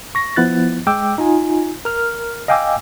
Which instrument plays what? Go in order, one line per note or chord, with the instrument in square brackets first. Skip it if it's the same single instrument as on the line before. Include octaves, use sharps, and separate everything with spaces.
[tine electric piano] C#6 A#6
F3 B3 E4 F#6 A6
G#3 G5 D6 E6
D#4 F4 G#5
A#4 F6
D#5 F5 G5 G#5 D6 E6